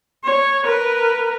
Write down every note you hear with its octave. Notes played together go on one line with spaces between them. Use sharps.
C#5
A#4 B4